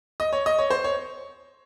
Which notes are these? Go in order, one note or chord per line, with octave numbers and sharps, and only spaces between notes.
D#5
C#5
D#5
C#5
C5
C#5